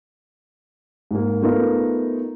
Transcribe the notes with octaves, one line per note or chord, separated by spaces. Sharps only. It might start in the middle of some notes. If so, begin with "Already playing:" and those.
G#2 A#3
A3 B3 D#4 F4 A#4